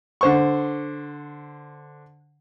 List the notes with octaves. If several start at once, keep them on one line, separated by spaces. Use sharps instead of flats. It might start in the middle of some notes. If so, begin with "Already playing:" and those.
D3 C5 C#6